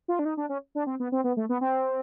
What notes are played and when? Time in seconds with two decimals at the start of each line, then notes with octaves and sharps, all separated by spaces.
0.08 F4
0.19 D4
0.25 D#4
0.37 D4
0.49 C#4
0.75 D4
0.87 C4
1.00 B3
1.12 C4
1.24 B3
1.37 A3
1.49 B3
1.61 C4